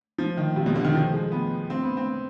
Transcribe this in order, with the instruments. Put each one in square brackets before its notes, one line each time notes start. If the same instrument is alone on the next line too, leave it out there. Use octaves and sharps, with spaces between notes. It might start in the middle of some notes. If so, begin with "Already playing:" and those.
[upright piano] F3
D#3
C3
B2
D3
D#3
F3
G#3
B3
C4
B3
C4